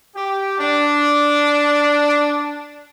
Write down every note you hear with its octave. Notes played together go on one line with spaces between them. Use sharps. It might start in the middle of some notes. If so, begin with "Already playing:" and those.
G4
D4